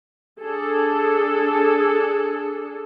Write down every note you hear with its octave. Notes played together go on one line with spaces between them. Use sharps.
D4 G#4 A4